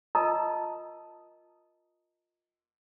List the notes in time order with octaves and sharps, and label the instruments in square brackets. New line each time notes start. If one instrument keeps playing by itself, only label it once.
[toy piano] F4 A#4 D#5 A5 A#5 D#6